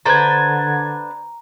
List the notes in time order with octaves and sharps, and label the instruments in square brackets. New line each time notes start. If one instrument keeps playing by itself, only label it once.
[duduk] D3 [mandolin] D4 B4 C5 [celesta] A#5 [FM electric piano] G#6 A6